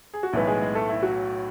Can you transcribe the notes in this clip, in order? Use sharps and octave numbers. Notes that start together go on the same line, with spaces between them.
G#4
F#4
B1 A2 E3 G#3 B3 E4
G#3 G#4
G#3 G#4
A3 A4
E4
F#3 F#4